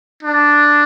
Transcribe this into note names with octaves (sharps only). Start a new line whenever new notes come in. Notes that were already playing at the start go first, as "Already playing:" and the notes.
D4